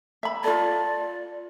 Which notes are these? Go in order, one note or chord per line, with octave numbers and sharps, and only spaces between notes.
E5 B5
F4 A4 D5